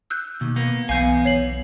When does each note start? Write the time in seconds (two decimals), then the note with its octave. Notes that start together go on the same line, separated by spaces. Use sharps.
0.10 E6 F#6 G6
0.41 D#2 B2
0.56 A#3 B3
0.89 B1 E2 B3 F5 G#5 G6 C7
1.25 C#5 C7 F#7